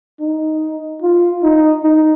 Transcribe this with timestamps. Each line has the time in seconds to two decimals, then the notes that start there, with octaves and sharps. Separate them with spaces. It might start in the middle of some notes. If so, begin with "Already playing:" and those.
0.20 D#4
1.02 F4
1.43 D#4
1.83 D#4